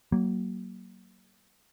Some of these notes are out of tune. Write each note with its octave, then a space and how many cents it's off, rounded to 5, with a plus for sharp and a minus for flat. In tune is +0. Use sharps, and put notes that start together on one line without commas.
F#3 +30 A#3 +0